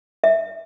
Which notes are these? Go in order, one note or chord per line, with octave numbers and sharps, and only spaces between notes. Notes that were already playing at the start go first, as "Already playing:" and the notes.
E5